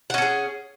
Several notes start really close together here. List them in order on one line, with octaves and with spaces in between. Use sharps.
F#5 C#4 A4 G#4